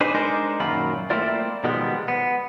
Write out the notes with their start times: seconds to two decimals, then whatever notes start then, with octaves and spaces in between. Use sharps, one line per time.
0.01 D4 D#4 G#4 B4 C5
0.14 G#3 D4 D#4 A#4 C5
0.60 F#2 A#2 D#3 F#3 F4 B5
1.10 A3 A#3 C4 E4 F4 D5
1.64 B2 D#3 F3 G3 G#3 B3
2.08 B3